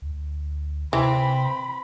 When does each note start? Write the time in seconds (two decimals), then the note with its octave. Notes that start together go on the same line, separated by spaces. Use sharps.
0.02 D2
0.93 C3 E3 C4 B5